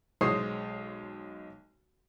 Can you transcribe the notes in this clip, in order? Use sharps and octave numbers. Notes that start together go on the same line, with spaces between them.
B1 G#3 C5 C#5 D#6 C7